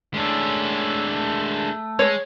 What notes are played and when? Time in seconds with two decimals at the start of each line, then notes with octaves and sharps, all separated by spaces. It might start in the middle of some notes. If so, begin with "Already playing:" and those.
0.14 G#3 A3 C#4 D4
1.08 A3
1.99 G#3 C#5